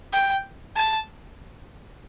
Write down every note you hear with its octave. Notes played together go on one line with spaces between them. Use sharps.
G5
A5